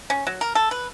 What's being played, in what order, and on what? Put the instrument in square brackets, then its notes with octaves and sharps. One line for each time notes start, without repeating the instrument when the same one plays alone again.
[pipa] C#4
F#3
A#4
A4
B4